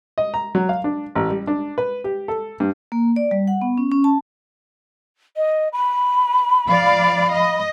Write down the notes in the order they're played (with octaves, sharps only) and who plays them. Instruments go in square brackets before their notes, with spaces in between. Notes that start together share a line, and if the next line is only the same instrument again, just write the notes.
[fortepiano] D#5
A#5
F#3
F5
D4
A1
G3
D4
B4
G4
A4
G2
[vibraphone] A#3
D5
G3
F#5
B3
C#4
C#4
A5
[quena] D#5
B5
[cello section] F3 D5 F5
D#5